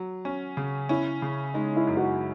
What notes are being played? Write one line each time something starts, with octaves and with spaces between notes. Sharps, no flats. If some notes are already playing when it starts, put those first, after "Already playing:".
Already playing: F#3
C#4
C#3
C#4 E4
C#3
G#3 D#4
E4
F#2
F#4